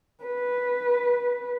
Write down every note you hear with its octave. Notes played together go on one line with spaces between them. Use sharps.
B4